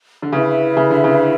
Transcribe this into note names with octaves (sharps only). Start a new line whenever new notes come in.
D3
C#3 E4 B4 E5
C#3
D3
C#3